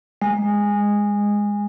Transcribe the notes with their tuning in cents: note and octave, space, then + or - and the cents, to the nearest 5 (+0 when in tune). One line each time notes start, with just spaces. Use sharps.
G#3 -15